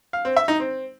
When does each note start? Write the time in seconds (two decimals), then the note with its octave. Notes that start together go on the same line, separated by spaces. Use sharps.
0.13 F5
0.25 C4
0.36 E5
0.48 D#4
0.60 C4